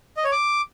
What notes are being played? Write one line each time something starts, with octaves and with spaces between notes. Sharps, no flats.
D#5
C#5
D6